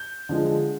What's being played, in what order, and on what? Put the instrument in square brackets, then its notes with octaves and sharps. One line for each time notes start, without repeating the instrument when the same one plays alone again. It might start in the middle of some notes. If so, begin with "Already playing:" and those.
Already playing: [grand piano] G6
D3 F3 G#3